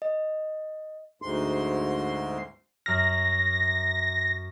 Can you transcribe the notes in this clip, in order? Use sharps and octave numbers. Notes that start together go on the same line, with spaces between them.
D#5
D2 G#2 C6
F#2 F6 A#6